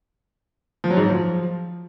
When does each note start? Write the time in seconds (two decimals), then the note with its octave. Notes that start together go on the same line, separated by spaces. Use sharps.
0.84 F3
0.90 F#3
0.97 G#2
1.03 F#3
1.10 F3